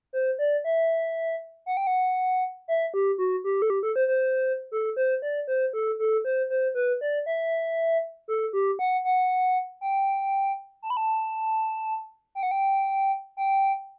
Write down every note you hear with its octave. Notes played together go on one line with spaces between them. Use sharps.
C5
D5
E5
F#5
G5
F#5
E5
G4
F#4
G4
A4
G4
A4
C5
C5
A4
C5
D5
C5
A4
A4
C5
C5
B4
D5
E5
A4
G4
F#5
F#5
G5
A5
B5
A5
G5
F#5
G5
G5